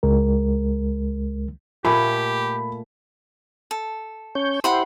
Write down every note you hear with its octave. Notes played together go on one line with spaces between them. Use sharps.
C#2 G#3 A#4
A#2 A3 G4 B5
A4
C#4 C#5 G6
E4 G4 C5 F#5 B5 C6